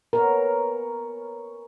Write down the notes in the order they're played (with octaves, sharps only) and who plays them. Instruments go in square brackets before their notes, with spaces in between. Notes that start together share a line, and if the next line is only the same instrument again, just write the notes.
[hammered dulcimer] B3 C#4 C#5 [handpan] A#4